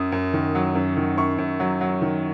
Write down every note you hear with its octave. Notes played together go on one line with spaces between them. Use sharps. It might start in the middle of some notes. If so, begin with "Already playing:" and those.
Already playing: F#2 D#6
F#2
D#3
F#3
F#2
D#3
F#2 C#6
F#2
F#3
F#3
D#3